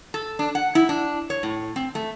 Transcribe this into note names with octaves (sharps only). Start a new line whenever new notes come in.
A4
D4
F#5
E4
D4
C#5
A2
C4
A3